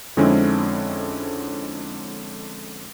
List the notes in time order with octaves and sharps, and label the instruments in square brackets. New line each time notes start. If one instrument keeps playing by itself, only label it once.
[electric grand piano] F2 D3 G#3 C4 C#4 E4